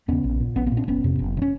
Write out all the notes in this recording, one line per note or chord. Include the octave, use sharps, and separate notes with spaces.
D#2 C#3 B3 C#4
A#1
A#2
A#1 B3 C#4
A#3 C4
A#2
C4 D4
F#1 B3 C#4
F2 C3
F#1
C3
C#4